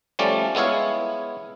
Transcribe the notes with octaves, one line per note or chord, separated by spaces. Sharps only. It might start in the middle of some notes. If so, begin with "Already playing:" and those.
F3 G3 A3 C#4 D5
G#3 B3 E4 C#5 F5